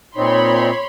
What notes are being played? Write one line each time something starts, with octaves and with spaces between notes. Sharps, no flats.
A#2 C4 D#4 C#5 B5 C6